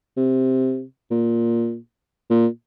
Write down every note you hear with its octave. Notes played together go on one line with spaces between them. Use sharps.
C3
A#2
A#2